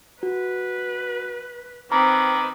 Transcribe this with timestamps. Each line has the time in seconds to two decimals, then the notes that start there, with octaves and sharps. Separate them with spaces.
0.23 F#4 B4
1.92 D#3 C4 B4 A#5 D6